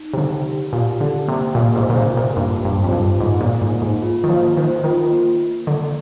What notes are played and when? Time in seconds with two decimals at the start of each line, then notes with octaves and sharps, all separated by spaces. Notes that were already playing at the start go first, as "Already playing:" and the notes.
Already playing: D#4
0.13 C3
0.18 D3 G4
0.46 G4
0.73 A#2 G4
1.01 D3 G4
1.27 C3 A#3
1.55 A#2 A#3
1.76 G#2
1.83 C5
1.90 A#2
1.96 C3
2.11 A#3
2.17 A#2
2.37 G2 A#3
2.64 G2 C5
2.84 F2
2.92 G2 F4
3.19 G#2 A#3
3.41 A#2
3.47 A#3
3.61 G#2
3.75 A#3
3.82 G#2
4.02 F4
4.24 D#3
4.29 F3 A#3
4.57 D#3 C5
4.84 D#3 F4
5.12 A#3
5.39 A#3
5.66 D3 A#3